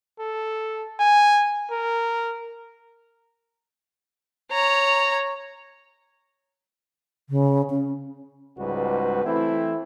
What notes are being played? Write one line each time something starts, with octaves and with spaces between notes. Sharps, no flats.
A4
G#5
A#4
C#5 A#5
C#3
C#4
C#2 G#2 G3 F#4 B4
E3 A3 C4 E4